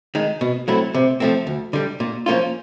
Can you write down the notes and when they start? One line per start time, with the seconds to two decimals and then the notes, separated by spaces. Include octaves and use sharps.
0.15 D#3 G#3
0.41 B2
0.68 F#3 A3 C4 E4
0.94 C3
1.20 F3 A3 C4
1.47 D2
1.73 D3 G3
2.00 A#2
2.26 F3 A#3 C#4 F4